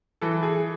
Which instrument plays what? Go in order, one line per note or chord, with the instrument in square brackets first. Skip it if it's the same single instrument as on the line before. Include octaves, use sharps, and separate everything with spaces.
[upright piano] E3 A4
G#4